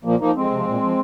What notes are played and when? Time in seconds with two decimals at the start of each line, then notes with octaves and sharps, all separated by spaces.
0.04 A#2 F3 A#3
0.20 F3 A#3 D#4
0.35 F2 G#3 C4
0.51 C3 F3
0.67 A#2
0.82 F3